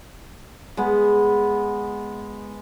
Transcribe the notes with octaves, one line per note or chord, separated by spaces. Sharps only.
G#3 B3